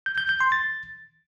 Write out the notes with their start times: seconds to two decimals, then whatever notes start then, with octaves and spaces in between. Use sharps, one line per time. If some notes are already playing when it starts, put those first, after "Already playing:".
0.06 G6
0.18 G6
0.29 G6
0.41 C6
0.52 A6